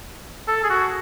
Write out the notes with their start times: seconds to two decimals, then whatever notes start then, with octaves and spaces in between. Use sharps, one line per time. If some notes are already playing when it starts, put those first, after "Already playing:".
0.48 A4
0.64 G#4
0.70 F#4